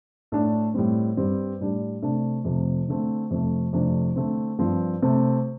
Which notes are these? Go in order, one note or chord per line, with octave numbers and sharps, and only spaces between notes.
A2 A3 D4
A2 G3 C4
G2 G3 C4
A2 G3 D4
C3 A3 D4
F2 C3 A3
D3 A3 C4
F2 C3 A3
F2 C3 A3 D4
D3 A3 C4
G2 F3 C4
C3 A3 C4